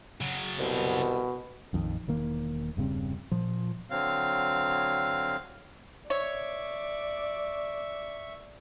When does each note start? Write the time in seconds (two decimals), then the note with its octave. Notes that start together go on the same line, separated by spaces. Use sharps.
0.21 C#3 F#3
0.59 C2 B2
1.73 A#1 F2 D#3
2.08 E1 D#3 A#3
2.77 E1 G2 C#3 C4
3.31 A#2 F3
3.90 D3 F#3 C4 F5
6.10 C#5 D5 E5 C#6